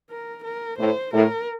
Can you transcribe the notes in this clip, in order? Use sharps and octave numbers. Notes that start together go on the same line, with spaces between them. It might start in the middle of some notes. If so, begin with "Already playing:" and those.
A#4
A#4
A2 C5
A2 A#4